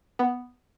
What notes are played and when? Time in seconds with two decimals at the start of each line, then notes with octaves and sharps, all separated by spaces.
0.19 B3